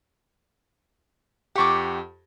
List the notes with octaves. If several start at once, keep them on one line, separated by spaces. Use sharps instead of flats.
F2 G4 F#5 C#6 D6